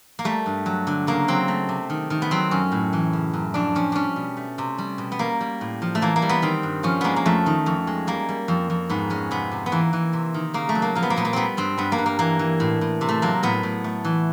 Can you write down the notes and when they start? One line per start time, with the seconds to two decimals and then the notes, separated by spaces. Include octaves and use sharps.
0.19 A#3
0.24 G3 A3
0.46 G2
0.66 F#3
0.87 D3
1.07 C#3 A#3
1.28 F#3 C4
1.48 A3
1.69 C3
1.90 D#3
2.10 D#3
2.22 B3
2.31 F#3 C4
2.51 F#2 C#4
2.72 A2
2.93 E3
3.13 C#3
3.33 F#2
3.54 F2 D4
3.75 F3 C#4
3.92 G3 C#4 D4
4.16 B2
4.37 A3
4.58 C3
4.78 G3
4.98 B2
5.12 B3
5.19 G3 A#3
5.41 G3
5.61 A2
5.82 F3
5.95 A3
6.02 E3 A#3
6.16 A#3
6.22 G3
6.29 B3
6.42 D#3 C4
6.63 G2
6.83 F3 C#4
7.01 G#3 A#3 B3
7.16 A#3
7.26 F2 A3
7.46 D#3
7.66 F2
7.87 G#3
8.07 G3 A#3
8.29 G3
8.48 F2
8.70 F2
8.90 G#2 B3
9.10 G#3 C#4
9.31 C3 B3
9.52 C3
9.66 B3
9.72 E3 A#3
9.93 E3
10.13 C3
10.34 D#3
10.54 C#3 A#3
10.69 A3
10.75 F#3
10.82 A#3
10.95 F3 A#3
11.03 B3
11.10 A#3
11.16 A#2 B3
11.25 A#3
11.33 G3 B3 C4
11.57 G2 C4
11.78 G2 B3
11.92 A#3
11.98 G2
12.06 A#3
12.19 E3 A#3
12.39 E3
12.60 A2
12.81 A2
13.01 C3
13.09 A3
13.22 F#3 A#3
13.43 A2 B3
13.63 A2
13.84 A3
14.05 E3